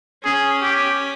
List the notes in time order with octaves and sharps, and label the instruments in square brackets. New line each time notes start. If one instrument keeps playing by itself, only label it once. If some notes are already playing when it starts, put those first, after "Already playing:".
[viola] C#4 [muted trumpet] G#4
[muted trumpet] G4